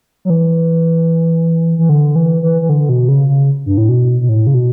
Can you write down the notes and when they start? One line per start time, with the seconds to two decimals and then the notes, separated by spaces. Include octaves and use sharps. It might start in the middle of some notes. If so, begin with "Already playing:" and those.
0.25 F#3
0.30 E3
1.78 E3
1.89 D3
2.16 E3
2.42 E3
2.62 E3
2.69 D3
2.89 B2
3.08 C#3
3.29 C#3
3.66 G2
3.78 A2
3.89 B2
4.21 B2
4.29 A2
4.47 C#3
4.54 B2